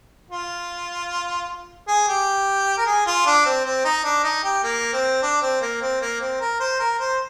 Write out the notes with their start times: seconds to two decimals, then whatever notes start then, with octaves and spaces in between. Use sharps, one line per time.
0.31 F4
1.88 G#4
2.08 G4
2.77 A#4
2.86 G#4
3.06 F4
3.26 D4
3.45 C4
3.65 C4
3.85 D#4
4.04 D4
4.24 D#4
4.44 G4
4.64 A#3
4.93 C4
5.22 D4
5.42 C4
5.61 A#3
5.81 C4
6.01 A#3
6.20 C4
6.40 A#4
6.60 C5
6.79 A#4
6.99 C5